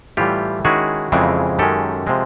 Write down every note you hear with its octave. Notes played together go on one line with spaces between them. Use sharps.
A2 E3 G3 F4 G4
D#3 G#3 C#4 E4 F#4 G#4
F2 C#3 E3 G#3 C4
F#2 D#3 G#3 C#4 G4 A4
C3 F3 G#3 C4